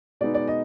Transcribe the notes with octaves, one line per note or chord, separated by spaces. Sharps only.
B2 G#3 B3 D#4 D5
D5
D#5